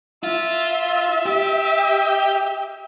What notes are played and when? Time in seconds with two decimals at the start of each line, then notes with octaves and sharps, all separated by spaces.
0.24 F4 E5
1.26 G4